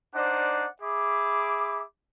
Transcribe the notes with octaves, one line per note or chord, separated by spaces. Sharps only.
D4 D#4 C5 D5 F#5
G#4 E5 B5 D6